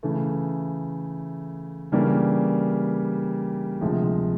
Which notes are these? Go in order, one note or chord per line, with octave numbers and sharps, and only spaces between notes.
C#3 E3 A3
C#3 E3 G3 A#3 D4
D2 C3 F3 G#3